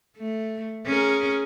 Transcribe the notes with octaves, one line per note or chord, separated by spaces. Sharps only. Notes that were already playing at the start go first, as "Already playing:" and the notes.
A3
C#4 G#4 A#4